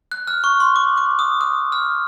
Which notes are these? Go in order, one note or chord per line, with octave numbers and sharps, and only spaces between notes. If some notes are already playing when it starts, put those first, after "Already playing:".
F#6
F6
C#6
C6
D6
D6
D#6
D#6
F6